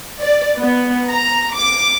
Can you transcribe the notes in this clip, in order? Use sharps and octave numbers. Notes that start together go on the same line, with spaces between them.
D5
B3
A#5
D6